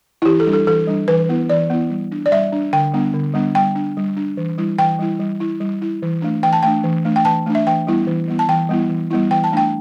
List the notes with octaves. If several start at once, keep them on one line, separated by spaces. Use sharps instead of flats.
E4
E3 G4
A4
G3 D4
A4
E3 A4
G3 D4
E3 B4
B3 E4
E3 D5
B3 E4
G3
D4
D5
G3 E5
D4
D3 G5
G3 B3 D4
D3
G3 B3 D4
G3 G5
D4
G3
D4
E3
G3 E4
E3 G5
G3 E4
G3
E4
G3
E4
E3
A3 D4
E3 G5
A5
A3 D4 G5
E3
A3 D4
G5
E3 A5
A3 D4
E5
E3 G5
G3 B3 E4
E3
G3 B3 E4
A5
E3 G5
G3 B3 E4
E3
G3 B3 E4
E3 G5
A5
A3 D4 G5